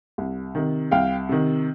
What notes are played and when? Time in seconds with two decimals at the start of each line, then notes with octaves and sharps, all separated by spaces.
0.18 C2
0.55 C3 D#3
0.91 C2 F5 G5
1.29 C3 D#3